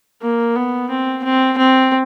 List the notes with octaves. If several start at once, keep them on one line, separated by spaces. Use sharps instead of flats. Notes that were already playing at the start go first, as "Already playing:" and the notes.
A#3
B3
C4
C4
C4